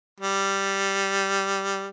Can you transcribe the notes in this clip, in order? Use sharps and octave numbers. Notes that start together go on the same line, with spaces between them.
G3